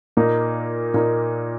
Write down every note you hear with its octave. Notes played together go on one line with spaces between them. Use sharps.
A#2 A#3 D#4
A#2 A#3 D#4